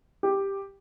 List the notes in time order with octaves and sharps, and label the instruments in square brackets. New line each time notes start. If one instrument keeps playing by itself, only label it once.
[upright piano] G4